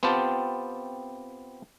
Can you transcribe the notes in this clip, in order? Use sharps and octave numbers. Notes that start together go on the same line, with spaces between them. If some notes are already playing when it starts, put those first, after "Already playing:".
B3 C4 F4 G4 A5